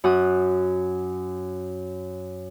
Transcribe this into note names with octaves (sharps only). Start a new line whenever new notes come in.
F#2 F#4 D#6 F#6